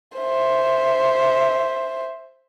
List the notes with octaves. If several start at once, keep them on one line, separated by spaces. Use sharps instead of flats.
C5 E5